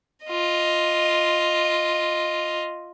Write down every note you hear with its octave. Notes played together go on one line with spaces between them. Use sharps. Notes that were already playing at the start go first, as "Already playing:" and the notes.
F4 D#5